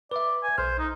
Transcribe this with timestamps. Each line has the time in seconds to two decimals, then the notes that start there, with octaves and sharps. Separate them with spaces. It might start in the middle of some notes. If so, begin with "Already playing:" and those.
0.11 B4 D5 E5
0.43 G#5
0.58 B1 C5 F6
0.78 D#4